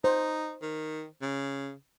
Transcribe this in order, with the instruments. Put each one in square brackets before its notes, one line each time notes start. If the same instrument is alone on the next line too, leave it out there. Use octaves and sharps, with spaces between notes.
[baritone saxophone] D#4 [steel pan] C5
[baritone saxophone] D#3
C#3